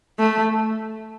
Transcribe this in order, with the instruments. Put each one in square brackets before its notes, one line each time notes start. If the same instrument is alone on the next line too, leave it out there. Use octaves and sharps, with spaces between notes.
[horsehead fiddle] A3